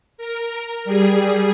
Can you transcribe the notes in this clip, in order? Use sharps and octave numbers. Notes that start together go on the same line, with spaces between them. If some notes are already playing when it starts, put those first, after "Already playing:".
A#4
G3 G#4